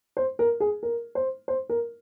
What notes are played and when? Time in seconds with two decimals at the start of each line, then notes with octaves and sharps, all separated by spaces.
0.17 C5
0.39 A#4
0.60 G#4
0.83 A#4
1.15 C5
1.48 C5
1.69 A#4